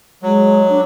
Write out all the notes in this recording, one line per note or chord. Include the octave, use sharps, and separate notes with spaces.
F#3 G#3
D4